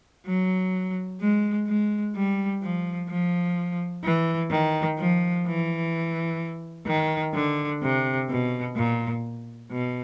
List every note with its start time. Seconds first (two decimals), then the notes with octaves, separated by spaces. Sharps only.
0.27 F#3
1.21 G#3
1.68 G#3
2.15 G3
2.62 F3
3.09 F3
4.04 E3
4.51 D#3
4.99 F3
5.46 E3
6.87 D#3
7.34 D3
7.82 C3
8.29 B2
8.76 A#2
9.71 B2